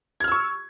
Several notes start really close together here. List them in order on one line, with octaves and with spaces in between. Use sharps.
G#6 F6 E6 C#6